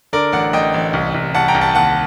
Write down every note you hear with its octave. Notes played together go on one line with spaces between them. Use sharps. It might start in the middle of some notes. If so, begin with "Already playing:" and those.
D3 A#4 D5
A1 D5 F#5
A1 D#5 G5
A1
C2
C2
C2 F#5 A5
G5 A#5
C2
F#5 A5
D#2 F#5 A5